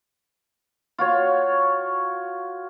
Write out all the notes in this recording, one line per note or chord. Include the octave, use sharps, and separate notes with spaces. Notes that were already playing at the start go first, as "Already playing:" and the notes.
F4 F#4 C#5